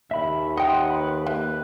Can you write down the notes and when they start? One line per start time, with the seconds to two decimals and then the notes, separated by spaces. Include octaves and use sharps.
0.11 D#2 E5 B5
0.57 D#5 F#5 G5 C6 D#6
0.90 B4 B5
1.26 A#3 B4 E5